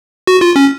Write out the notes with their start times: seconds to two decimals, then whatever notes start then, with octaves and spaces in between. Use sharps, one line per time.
0.27 F#4
0.41 F4
0.56 C#4